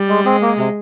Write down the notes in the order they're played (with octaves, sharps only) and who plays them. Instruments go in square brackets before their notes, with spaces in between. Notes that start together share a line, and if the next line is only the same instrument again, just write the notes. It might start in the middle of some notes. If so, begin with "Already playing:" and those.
Already playing: [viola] G3
[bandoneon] G#3
[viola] G#3 [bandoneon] C4
[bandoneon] A#3
C3